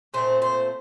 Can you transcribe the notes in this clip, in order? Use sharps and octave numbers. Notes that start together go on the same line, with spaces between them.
A#2 A3 C4 C5
C5